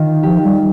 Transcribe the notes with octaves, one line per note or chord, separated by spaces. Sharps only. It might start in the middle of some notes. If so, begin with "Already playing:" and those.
Already playing: D#3 F4
F3 G4
G3